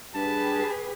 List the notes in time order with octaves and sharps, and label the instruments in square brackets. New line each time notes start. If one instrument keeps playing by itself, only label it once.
[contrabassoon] G2 [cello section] G4 G#4 B4 [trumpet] A5